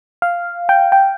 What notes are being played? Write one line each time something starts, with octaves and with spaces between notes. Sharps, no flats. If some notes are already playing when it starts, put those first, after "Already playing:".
F5
G5
G5